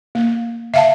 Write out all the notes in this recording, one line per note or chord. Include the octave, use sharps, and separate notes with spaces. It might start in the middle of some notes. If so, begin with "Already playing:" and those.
A#3
E5 F5 A5